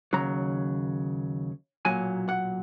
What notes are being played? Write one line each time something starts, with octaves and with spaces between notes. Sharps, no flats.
D#2 C#3 F#3 A#5
B1 A#2 F#3 G#5
F#5